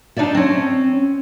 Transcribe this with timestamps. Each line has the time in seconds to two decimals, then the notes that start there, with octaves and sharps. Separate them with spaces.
0.16 D4 D#4 C5 D5 E5
0.35 C4 C#4